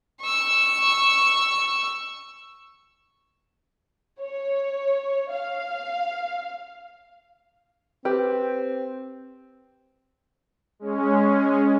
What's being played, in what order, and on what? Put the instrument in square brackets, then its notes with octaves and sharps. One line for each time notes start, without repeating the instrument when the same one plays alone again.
[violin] C#6 E6
[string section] C#5
F5
[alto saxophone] C4 [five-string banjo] G4 B4
[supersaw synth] G#3 C#4